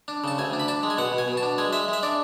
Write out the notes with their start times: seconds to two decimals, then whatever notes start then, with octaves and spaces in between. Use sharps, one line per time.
0.08 D4
0.24 C#3 A5
0.38 D2 G#5
0.53 D4
0.60 B5
0.68 D4 A5
0.83 G#3
0.90 G#5
0.97 B2 F#5
1.13 B2
1.18 G#5
1.28 B2
1.37 A5
1.43 D4
1.58 G#3 G#5
1.73 G#3 E5
1.88 G#3 E5
2.03 D4 D5